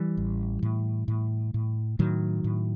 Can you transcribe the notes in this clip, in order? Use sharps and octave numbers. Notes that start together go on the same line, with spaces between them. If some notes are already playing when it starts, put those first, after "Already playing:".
Already playing: E3 G3
A1
A2
A2
A2
A2 D#3 F#3
A2